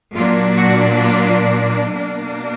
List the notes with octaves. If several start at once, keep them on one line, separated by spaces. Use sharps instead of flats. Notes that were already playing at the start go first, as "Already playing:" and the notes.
A#2 F#3 A#3 D4 F4
F#4
F4
B2 A#3 D4